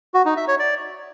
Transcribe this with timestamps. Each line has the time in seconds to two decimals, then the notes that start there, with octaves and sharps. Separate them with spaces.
0.14 F#4
0.25 D#4
0.37 E5
0.48 C#5
0.59 D5